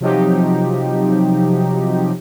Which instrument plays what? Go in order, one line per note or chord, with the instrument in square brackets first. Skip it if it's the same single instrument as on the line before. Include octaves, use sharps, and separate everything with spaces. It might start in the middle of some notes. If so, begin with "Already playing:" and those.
[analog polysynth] C3 F3 F#3 D#4 G4